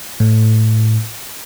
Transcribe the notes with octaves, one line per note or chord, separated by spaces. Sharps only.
A2